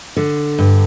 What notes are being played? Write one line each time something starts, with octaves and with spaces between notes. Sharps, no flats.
D3
G2